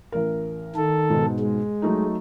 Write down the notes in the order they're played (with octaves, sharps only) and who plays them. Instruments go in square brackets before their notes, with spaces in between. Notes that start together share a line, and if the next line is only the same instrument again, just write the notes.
[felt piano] A1 A#4
[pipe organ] D#3 A4
[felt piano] G#2 B2
[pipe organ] G#3
[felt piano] F#3 A3 D#4